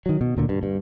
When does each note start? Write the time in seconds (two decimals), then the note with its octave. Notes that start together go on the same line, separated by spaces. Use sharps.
0.06 D#3 F#3
0.21 B2
0.36 D2 A#2 D3
0.49 G2
0.63 G2